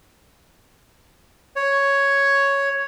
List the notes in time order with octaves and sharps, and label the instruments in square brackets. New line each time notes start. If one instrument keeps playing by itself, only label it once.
[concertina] C#5